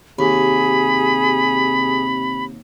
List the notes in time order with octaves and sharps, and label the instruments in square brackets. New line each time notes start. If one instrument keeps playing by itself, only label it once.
[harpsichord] D#2 [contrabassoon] C3 [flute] G#4 [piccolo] B5